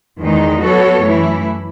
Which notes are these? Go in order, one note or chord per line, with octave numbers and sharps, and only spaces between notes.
E2 D#3 G#3 D#4
F#3 B3 F#4 A4 C#5
F#2 E3 A3 E4